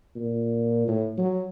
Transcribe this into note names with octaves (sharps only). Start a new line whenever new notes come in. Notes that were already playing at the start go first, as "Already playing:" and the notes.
A#2
A2
F#3